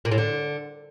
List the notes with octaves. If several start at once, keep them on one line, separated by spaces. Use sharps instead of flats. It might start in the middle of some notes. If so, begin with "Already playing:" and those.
A#2
A2
D3